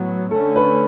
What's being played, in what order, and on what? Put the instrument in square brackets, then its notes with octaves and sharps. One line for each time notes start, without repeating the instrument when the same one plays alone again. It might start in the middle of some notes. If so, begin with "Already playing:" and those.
Already playing: [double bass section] A2 F#3 B3
[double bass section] D3 A3 C#4 [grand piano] A4
[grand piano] B4